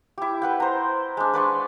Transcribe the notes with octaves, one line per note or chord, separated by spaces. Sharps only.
E4 G4
B4 F#5 G5
C5 A#5
G#3 D4
B4 D5 C6 C#6